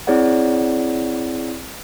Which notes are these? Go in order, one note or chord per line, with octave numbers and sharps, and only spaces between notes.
C4 E4 G#4 C#5 D5 F#5